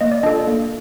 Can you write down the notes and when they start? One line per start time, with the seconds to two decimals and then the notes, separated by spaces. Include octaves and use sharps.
0.01 A#3 D#5
0.12 D5
0.23 D4 F4 A4 D#5
0.47 A#3